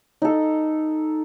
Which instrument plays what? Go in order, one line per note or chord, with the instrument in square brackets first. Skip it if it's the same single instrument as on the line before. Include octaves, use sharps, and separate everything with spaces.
[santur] D#4 A4